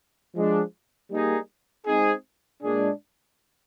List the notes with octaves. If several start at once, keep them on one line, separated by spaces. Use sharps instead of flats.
F3 G#3 D4
G3 A#3 D#4 G#4
G#3 C4 D#4 G#4
A#2 G#3 D4 G#4